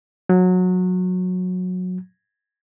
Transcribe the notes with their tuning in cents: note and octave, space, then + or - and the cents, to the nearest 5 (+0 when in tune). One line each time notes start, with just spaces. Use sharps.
F#3 -20